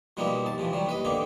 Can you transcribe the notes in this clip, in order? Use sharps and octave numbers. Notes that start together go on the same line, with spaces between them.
B2 F3 G3 A#3 B3 D#4
D#2 A5
C3 E3 F3
C3 F#3 G3
D#2 B4 D#5
D3 D#3 A#3 B3 G4